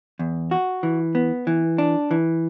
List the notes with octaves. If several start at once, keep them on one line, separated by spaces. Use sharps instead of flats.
E2
F#4
E3
B3
E3
D4
E3